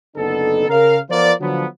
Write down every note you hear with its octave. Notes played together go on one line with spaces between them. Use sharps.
F#1 D3 B3 D#4 A4
C#3 A#4 F5
F3 B3 F4 A#4 C5 D5
D3 F3 F#3 B3